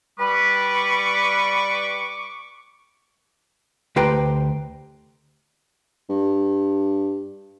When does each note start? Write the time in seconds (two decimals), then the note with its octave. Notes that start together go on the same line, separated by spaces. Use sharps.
0.18 G3 B4 C#6 D6
3.96 D2 G4 B4 C5 G5 A#5
6.09 G2